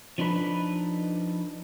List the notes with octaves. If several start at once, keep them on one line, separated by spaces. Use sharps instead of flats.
F3 D4 D#4 A4 B4